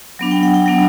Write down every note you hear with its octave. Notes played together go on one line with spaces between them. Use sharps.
F#3 B3 D4
G5
F#5
G5
F#3 B3 D4 F#5